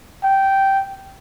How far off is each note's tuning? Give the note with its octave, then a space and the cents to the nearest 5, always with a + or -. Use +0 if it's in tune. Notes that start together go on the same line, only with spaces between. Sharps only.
G5 -10